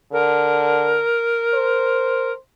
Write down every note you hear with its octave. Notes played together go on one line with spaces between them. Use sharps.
D3 A#4
C5